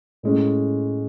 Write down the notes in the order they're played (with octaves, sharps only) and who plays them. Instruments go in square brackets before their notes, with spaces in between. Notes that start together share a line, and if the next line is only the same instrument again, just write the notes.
[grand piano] A2 G#3 C#4